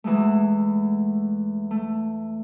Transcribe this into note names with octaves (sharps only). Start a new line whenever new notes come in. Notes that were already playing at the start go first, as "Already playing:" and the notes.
E2 E3 G#3 A3
A3